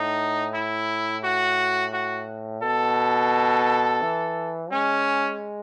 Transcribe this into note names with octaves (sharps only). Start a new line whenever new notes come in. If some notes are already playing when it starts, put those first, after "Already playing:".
Already playing: A2 D#4
E4
F#4
F#4
B2 A4
E3
G#3 C#4